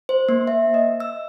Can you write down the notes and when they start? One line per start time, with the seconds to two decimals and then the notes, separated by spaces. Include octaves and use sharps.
0.09 C5
0.29 A#3
0.47 E5
0.74 D#5
1.00 E6